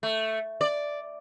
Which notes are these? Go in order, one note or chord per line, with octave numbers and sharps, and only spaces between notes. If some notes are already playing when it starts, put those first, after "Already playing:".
A3
D5